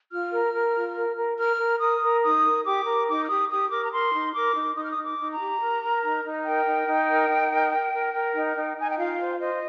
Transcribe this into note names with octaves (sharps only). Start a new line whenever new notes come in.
F4 F6
A#4
A#4
F4
A#4
A#4
A#4 F6
A#4
A#4 D#6
A#4
D#4 D#6
A#4
G4 D6
A#4
D#4 D6
F6
G4 D#6
G4 D#6
A#4 D6
A#5
A#4 C6
D#4
A#4 D6
D#4
D#4 D#6
F6
D#6
D#4
D6
D#4
A#5
G4
A#4
A#4
D#4
D#4
A#4 G5
D#4
D#4
A#4
D#4
A#4
A#4
A#4
A#4
D#4
D#4
D#4 G#5
G5
F4 F5
C5
C5 D#5